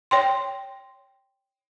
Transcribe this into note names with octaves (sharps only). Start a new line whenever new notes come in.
C#5 G5 C6